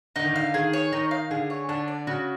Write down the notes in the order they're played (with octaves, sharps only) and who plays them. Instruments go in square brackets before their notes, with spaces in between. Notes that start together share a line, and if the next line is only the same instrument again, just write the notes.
[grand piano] D3 [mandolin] D#4
[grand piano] D#3
[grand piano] D3 [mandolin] F5
[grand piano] D#3 [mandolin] G#4
[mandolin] C#5
[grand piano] D#3 [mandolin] D#4
[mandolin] F5
[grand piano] D3 [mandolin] G#4
[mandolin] C#5
[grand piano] D3 [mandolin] D4
[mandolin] D5
[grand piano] C#3 [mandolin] F#4